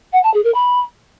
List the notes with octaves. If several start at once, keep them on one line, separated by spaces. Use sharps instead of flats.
F#5
A5
G#4
A#4
B5